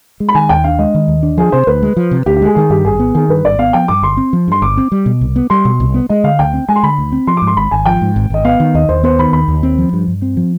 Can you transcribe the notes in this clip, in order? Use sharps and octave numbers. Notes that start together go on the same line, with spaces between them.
G#3
B5
D#3 G#5
D#2 G5
D4 F5
G#3 D#5
D#3
D#2
D4
F3 G#4
C3 C5
D2 B4
G#3
F3
C3
D2 G4
G4
G#3 G#4
D#3 G#4
G2 G4
G#1 G#4
B3
D#3 G#4
G2 B4
G#1 D5
B3 F5
F3 G5
G2 D6
G1 C6
C4
F3
G2 C6
G1 D6
C4
G3
B2
C2
B3
G3 C6
B2
C2
B3
G#3 D#5
D3 F5
D2 G5
C4
G#3 G#5
C6
D3 B5
D2
C4
F3 C6
G#2 D6
C6
G#1 B5
G#1 G#5
F3 G5
G#2
G#1
G#1 D#5
B3 F5
D#3
D#2 D#5
D#2 C5
B3 C5
D#3 B5
D#2 B5
D#2
C4
F3
G2
G2
C4
F3